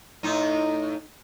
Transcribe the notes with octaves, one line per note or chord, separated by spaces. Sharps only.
A2 D#4